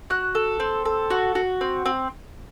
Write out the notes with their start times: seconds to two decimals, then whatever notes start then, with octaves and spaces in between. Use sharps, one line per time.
0.10 F#4 F#6
0.35 A4
0.60 C4
0.85 A4
1.10 F#4
1.35 F#4
1.61 C4
1.85 C4